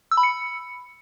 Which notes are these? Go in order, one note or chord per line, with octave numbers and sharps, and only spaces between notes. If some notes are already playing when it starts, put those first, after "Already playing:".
E6
B5
C#7